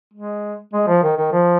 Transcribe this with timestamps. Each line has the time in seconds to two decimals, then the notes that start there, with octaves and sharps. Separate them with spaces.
0.14 G#3
0.73 G#3
0.88 F3
1.03 D#3
1.17 D#3
1.32 F3